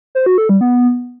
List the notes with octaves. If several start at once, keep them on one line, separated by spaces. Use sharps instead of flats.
C5
F#4
A4
G3
B3